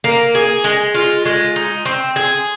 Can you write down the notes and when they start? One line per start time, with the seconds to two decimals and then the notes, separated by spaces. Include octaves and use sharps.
0.04 A#3
0.35 G#4
0.64 G#3
0.95 F4
1.26 G#3
1.56 D#4
1.86 C4
2.16 G#4